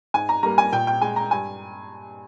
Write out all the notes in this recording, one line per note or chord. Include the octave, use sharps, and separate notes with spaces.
G#2 G#5
A#5
G3 A#3 A#5
G#5
A#2 G5
G5
G#3 G#5
A#5
G2 G#5